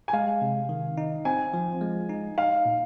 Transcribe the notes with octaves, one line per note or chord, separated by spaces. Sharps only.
G#5
G#3 F5
C3
D#3
D#4
C4 G#5
F3
G#3
D#4
D#4 F5
A#2